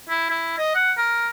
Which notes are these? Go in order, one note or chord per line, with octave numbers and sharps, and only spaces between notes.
E4
E4
D#5
F#5
A#4